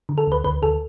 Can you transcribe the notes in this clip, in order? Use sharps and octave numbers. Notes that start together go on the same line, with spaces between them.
D3
A4
D2 B4
D2 B4
D2 A4